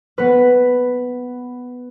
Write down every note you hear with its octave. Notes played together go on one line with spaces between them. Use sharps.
B3 B4